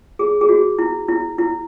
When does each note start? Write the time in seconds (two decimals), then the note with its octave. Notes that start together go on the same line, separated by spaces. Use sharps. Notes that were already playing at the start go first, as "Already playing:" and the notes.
0.19 G#4
0.41 G#4
0.49 F#4
0.79 E4
1.08 E4
1.38 E4